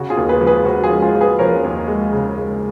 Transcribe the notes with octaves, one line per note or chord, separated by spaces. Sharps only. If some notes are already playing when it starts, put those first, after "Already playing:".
Already playing: C#3 F#4
F4 G#4
D#2
G#4 B4
F3
G#4 B4
F3 F#4
F4 G#4
G#3
F4 G#4
F3
G#4 B4
F3 A#4 C#5
D#2
G#3
C#3
G#3